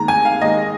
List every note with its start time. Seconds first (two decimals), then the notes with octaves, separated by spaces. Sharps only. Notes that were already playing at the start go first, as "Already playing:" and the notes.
Already playing: D#2 D#3 G#3 A#5
0.08 G#5
0.25 F5
0.41 D#2 D#3 G#3 D#5